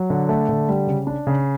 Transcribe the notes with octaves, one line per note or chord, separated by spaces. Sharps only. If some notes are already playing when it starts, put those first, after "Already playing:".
Already playing: F#3
D3
A3
D3
G3
C#3
D4
C#3